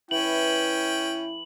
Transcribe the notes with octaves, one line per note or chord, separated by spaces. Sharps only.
E3 C#4 E4 G5 F#7